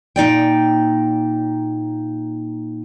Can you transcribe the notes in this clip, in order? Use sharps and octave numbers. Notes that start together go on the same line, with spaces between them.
A#2 D#4 D5 G5